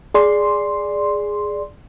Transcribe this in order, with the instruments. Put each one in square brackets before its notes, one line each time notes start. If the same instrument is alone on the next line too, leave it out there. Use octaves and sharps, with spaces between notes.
[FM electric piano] G#4 D5 C6